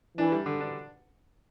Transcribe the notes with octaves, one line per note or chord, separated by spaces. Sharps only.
E3 D4
G3
D3
D4